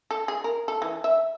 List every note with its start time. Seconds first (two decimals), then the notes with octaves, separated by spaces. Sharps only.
0.11 A4
0.28 G#4
0.44 A#4
0.68 A4
0.82 E3
1.04 E5